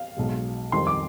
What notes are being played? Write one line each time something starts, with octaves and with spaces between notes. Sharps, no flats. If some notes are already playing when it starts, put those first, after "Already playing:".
Already playing: F5
B1 B2 G#3
F2 D#3 G3 C6
D6